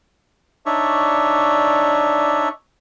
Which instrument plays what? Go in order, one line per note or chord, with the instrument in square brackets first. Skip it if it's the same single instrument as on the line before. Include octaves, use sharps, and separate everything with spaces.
[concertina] D4 D#4 C#5 D5 E5 C#6